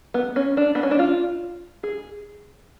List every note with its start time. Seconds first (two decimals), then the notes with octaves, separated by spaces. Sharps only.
0.14 B3
0.36 C#4
0.57 D4
0.75 B3
0.83 C#4
0.91 D4
0.99 F4
1.83 G#4